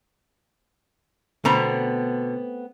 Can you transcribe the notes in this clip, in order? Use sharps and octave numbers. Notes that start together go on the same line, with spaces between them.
B2 D3 A3 B3 C4 A#5